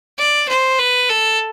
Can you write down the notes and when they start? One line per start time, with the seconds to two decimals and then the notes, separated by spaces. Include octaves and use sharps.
0.18 D5
0.49 C5
0.79 B4
1.09 A4